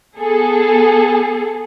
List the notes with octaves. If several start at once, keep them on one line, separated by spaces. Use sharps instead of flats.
B3 G#4 A4